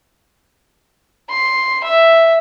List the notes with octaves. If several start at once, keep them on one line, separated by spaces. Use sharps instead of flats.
C6
E5